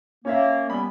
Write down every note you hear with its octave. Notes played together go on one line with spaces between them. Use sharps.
A#3 C#4 C#5 E5
G3 B3 G#5 B5